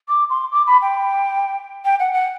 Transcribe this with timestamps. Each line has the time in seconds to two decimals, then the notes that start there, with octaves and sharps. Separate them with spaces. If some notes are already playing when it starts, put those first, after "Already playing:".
0.09 D6
0.30 C6
0.52 D6
0.67 B5
0.82 G5
1.85 G5
2.00 F#5
2.13 F#5